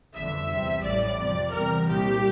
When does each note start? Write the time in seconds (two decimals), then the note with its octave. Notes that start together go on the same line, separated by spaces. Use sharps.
0.15 G1 F2 D3 E5
0.49 E2 C3 G3
0.83 A1 A2 G3 D5
1.17 F2 C3 F3
1.51 E2 C3 G3 A#4
1.85 C2 A#2 G3 G4